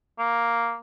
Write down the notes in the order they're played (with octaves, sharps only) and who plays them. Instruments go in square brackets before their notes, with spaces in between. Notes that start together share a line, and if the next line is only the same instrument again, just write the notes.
[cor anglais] A#3